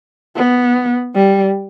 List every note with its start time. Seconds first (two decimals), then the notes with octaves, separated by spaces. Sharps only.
0.36 B3
1.15 G3